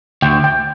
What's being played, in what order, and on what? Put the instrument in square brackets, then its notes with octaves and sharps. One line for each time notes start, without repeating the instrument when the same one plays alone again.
[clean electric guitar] D2 [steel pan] G5
[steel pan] G5